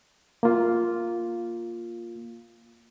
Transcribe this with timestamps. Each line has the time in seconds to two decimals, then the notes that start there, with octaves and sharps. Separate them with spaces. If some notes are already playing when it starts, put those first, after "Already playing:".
0.43 A#3 F4